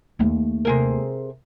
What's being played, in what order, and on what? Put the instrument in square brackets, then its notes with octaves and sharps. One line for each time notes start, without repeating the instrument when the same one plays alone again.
[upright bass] D#2 A3
[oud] C3 G#4 A#4